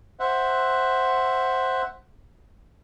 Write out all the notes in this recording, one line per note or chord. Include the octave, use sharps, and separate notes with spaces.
C5 E5 F#5